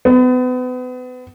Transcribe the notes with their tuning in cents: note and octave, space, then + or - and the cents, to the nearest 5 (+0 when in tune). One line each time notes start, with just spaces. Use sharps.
B3 +35